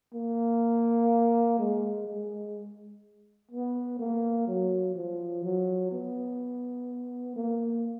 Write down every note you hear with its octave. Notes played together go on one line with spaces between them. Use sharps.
A#3
G#3
G#3
B3
A#3
F#3
F3
F#3
B3
A#3